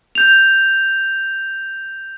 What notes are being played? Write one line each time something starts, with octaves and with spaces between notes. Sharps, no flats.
G6 F7